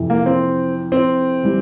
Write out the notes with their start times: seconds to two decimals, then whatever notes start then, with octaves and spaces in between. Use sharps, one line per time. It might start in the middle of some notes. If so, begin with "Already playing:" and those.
Already playing: F2 C3 E3
0.10 A#3
0.26 C4
0.92 C4
1.43 E3 G3